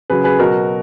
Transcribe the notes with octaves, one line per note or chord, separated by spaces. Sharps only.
C#3 F#3 G#4 B4
G#4 B4
B2 F#3 F#4 A#4